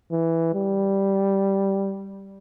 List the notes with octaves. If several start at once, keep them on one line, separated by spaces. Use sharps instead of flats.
E3
G3